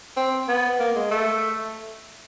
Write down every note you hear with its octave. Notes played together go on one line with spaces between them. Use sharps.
C4
B3
A#3
G#3
A3